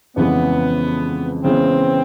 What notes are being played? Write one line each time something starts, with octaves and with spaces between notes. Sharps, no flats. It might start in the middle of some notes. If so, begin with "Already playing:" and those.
F2 C#3 E3 G#3 B3
C#3 E3 G#3 B3 C4